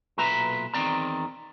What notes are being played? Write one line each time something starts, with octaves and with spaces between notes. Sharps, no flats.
B1 A#2 B4 E5 A#5
E2 D#3 F#3 C4 D5 A#5